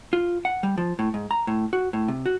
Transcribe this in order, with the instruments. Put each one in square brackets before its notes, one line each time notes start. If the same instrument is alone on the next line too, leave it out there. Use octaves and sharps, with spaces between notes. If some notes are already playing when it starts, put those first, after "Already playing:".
[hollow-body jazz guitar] F4
F#5
G3
F3
A2
G#2
A#5
A2
F#4
A2
C3
F#4